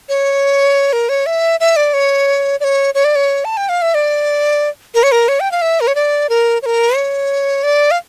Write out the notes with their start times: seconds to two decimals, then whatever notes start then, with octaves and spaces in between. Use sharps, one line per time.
0.09 C#5
0.93 A#4
1.09 C#5
1.26 E5
1.60 E5
1.76 D5
1.94 C#5
2.60 D5
2.64 C#5
2.95 C#5
3.05 D5
3.16 C#5
3.45 A5
3.57 G5
3.69 F5
3.82 E5
3.95 D5
4.95 A#4
5.03 C#5
5.12 A#4
5.28 C#5
5.40 G5
5.52 F5
5.62 E5
5.81 A#4
5.87 C#5
5.95 D5
6.29 A#4
6.62 C#5
6.66 A#4
6.96 C#5
7.63 D5
7.91 F5